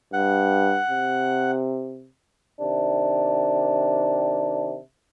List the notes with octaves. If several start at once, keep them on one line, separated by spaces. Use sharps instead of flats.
G2 F#5
C3
C3 D#3 D4